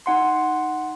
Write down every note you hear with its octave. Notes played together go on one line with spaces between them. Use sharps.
D#4 F#5 C6